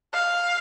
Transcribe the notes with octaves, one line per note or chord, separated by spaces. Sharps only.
F5